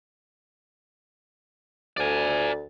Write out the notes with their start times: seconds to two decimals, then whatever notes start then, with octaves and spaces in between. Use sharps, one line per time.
1.97 D2 D5 G#5